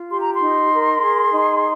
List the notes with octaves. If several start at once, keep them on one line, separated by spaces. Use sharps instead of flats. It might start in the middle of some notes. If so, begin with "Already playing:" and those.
Already playing: F4
G4 C6
A#5
C6
D#4
A#4
G#4
D#4